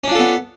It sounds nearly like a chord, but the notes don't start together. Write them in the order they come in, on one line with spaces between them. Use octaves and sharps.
C#4 D4 F4 A4 B3